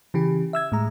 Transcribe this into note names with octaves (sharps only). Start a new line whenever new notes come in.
C#3 E3 G4
E5 E6 G#6
A2 G#3 A#5